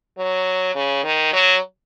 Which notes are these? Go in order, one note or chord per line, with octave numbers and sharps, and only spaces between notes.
F#3
C#3
D#3
F#3